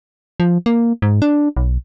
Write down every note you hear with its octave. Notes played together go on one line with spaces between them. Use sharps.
F3
A#3
G#2
D4
B1